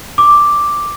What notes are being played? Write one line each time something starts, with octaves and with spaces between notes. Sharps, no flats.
D6